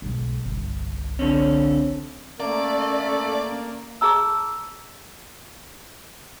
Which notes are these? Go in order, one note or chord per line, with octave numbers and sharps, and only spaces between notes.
B1 G#2
G1 C2
D3 C4 C#4
A3 A#3 C#4 D5
G#4 A5 A#5 E6